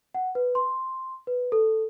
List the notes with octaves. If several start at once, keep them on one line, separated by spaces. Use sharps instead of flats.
F#5
B4
C6
B4
A4